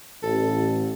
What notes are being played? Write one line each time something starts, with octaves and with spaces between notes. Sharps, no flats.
A1 A4